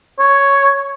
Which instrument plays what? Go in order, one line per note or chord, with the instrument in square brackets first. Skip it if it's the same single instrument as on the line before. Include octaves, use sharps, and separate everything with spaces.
[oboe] C#5